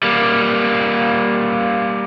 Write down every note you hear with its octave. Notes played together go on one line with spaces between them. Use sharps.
G3 A#3